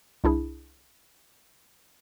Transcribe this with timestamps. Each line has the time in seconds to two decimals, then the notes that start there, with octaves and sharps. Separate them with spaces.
0.24 C2 D4 E4 G#4